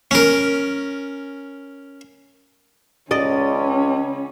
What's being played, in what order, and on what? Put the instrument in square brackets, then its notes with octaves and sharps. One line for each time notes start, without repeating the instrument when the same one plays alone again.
[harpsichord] C#4 A#4
[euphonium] C#2 [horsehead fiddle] C#4 [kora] D5 D#5